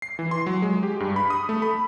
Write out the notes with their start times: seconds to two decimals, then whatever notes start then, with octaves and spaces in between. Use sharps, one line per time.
0.02 C7
0.19 E3
0.31 C6
0.46 F#3
0.62 G#3
0.83 G4
1.00 G2
1.16 B5
1.30 D#6
1.49 A3
1.62 B5